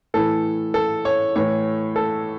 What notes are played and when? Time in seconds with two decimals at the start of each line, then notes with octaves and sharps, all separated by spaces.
0.14 A2 E3 A4
0.74 A4
1.05 C#5
1.36 A2 E3 C#5
1.96 A4